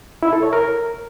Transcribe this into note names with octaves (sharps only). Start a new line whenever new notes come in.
E4
A4
C#5
A#4